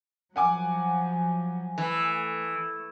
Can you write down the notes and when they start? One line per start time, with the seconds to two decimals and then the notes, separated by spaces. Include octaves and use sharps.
0.36 F3 F#3 F#5 G#5 D6
1.78 E3 A3